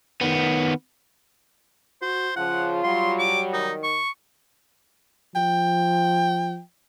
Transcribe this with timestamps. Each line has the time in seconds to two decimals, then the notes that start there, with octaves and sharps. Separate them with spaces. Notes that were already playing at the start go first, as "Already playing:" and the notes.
0.21 D#3 B3
2.02 F#4 C5
2.37 C#3 F3 F4 F#5
2.84 F#3 G3 C6
3.19 D6
3.53 D#3 D#4
3.84 C#6
5.35 F3 G5